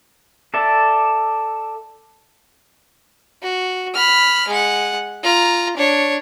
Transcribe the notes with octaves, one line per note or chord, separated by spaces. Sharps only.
A4 D5 E5
F#4
B5 F6
G#3 F#5
F4 A#5
D4 C#5